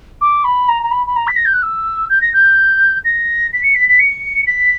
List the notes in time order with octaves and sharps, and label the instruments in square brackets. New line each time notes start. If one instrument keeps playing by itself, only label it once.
[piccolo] D6
B5
A#5
A#5
B5
B5
A#5
B6
A#6
G6
F#6
E6
G6
A#6
G6
A#6
B6
C#7
B6
B6
C#7
B6